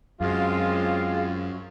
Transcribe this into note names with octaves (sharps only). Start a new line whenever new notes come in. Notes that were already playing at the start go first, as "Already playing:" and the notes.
F#2 G#3 C4 F4